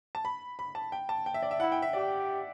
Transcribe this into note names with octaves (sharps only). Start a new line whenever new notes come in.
A5
B5
B5
A5
G5
A5
G5
E5
D5
E5
E4 F#5
G5
E5
G4 D5